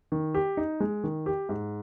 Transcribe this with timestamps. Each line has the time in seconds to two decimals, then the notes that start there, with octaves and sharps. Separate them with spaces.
0.12 D#3
0.35 G4
0.57 D#4
0.80 G#3
1.04 D#3
1.26 G4
1.49 G#2